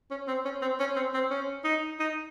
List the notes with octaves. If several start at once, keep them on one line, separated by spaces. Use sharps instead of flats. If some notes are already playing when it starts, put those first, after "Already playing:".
C#4
C4
C#4
C4
C#4
C4
C4
C#4
D#4
D#4